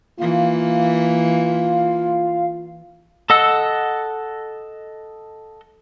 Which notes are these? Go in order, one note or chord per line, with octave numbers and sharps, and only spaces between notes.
E3 A#3 F4 F5
A4 D#5 F#5 E6